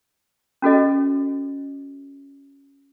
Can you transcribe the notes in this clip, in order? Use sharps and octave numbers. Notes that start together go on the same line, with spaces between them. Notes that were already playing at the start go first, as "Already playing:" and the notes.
C#4 F#4 A4 D#5